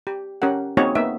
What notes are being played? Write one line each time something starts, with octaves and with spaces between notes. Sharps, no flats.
G4
C#4 G4 A#4 F#5
A#3 C4 D#4 F#4 G#4 C#5
A#3 B3 D#4 E5